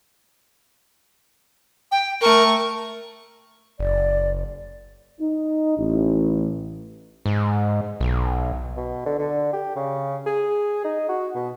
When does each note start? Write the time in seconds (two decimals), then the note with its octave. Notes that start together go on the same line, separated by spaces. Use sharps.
1.92 G5
2.21 A3 A#4 C#6
3.79 F#1 D5
5.20 D#4
5.77 A1
7.26 G#2
8.01 B1
8.77 B2
9.06 D3
9.19 D3
9.53 G4
9.76 C#3
10.26 G#4
10.84 D#4
11.09 F#4
11.35 B2